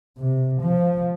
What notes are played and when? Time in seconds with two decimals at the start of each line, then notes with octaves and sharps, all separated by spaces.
0.18 C3
0.61 F3